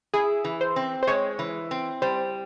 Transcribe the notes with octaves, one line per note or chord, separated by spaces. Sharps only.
E4 G#4
E3
C5
C4
C5
G#3 C#5
E3
C4
G3 C5